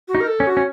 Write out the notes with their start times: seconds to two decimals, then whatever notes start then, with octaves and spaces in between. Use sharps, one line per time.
0.08 F#4
0.15 D#4
0.20 A#4
0.27 A4
0.40 C#4
0.47 F#4
0.57 C#4